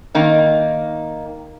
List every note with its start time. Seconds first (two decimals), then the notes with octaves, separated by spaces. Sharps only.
0.15 D#3 A#3 D#4